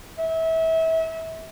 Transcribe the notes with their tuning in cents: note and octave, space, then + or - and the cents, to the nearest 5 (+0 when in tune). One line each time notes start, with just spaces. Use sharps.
E5 -30